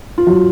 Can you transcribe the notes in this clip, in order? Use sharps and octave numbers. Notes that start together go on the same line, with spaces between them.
F4
F#3 F#4